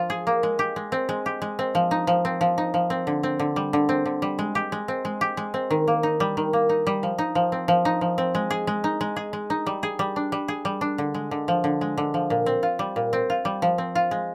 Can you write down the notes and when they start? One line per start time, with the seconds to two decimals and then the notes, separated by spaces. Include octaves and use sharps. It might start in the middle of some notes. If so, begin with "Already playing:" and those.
Already playing: F3 F4
0.10 G#4
0.27 A#3
0.43 G#3
0.59 G4
0.76 G#3
0.92 C4
1.09 G#3
1.26 G4
1.42 G#3
1.59 C4
1.75 F3
1.91 D#4
2.07 F3
2.25 C4
2.41 F3
2.58 D#4
2.74 F3
2.90 C4
3.07 D3
3.23 C4
3.39 D3
3.56 G3
3.73 D3
3.89 C4
4.06 D3
4.22 G3
4.39 G#3
4.55 G4
4.72 G#3
4.88 C4
5.05 G#3
5.21 G4
5.37 G#3
5.54 C4
5.70 D#3
5.88 A#3
6.03 D#4
6.20 G3
6.37 D#3
6.53 A#3
6.69 D#4
6.87 G3
7.03 F3
7.18 D#4
7.35 F3
7.52 C4
7.68 F3
7.85 D#4
8.01 F3
8.18 C4
8.35 G#3
8.50 G#4
8.67 G#3
8.84 D#4
9.01 G#3
9.16 G#4
9.33 G#3
9.50 D#4
9.66 G3
9.83 G#4
9.99 G3
10.16 D4
10.32 G3
10.48 G#4
10.65 G3
10.81 D4
10.98 D3
11.14 G#3
11.31 D3
11.48 F3
11.64 D3
11.81 G#3
11.97 D3
12.14 F3
12.30 A#2
12.46 C4
12.63 F4
12.79 G3
12.96 A#2
13.13 C4
13.30 F4
13.45 G3
13.62 F3
13.78 C4
13.95 F4
14.11 G#3